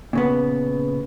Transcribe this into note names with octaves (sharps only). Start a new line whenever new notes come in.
A#2 C#3 B3